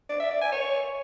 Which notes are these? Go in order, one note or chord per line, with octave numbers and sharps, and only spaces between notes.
D5
E5
D5
G#5
C#5